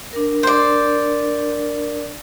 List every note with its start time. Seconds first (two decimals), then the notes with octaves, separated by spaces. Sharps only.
0.13 D4 A#4
0.43 C5 D5